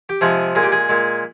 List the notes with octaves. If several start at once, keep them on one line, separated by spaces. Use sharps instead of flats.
G4
C3 F3 G#3 G#4
A#2 G#3 G#4
G4
G#4
A#2 G#3